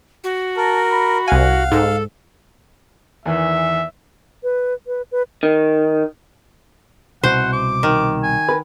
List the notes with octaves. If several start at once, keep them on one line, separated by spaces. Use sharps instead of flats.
F#4
A#4 A5
B5
C2 F5 F#5 G#5
G#2 A4
E2 D#3 E3 E5
B4
B4
B4
D#3
C2 B2 C5 F#5
D6
D#3
G#5
A#4 B4